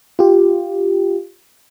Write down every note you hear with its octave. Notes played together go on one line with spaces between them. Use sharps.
F4 G4